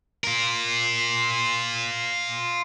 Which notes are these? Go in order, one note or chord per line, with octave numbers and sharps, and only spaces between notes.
F4 A#4